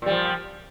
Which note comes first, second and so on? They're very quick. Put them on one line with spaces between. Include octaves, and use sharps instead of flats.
A#2 G3 F3